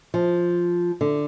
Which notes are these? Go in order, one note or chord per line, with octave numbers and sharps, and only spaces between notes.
F3
D3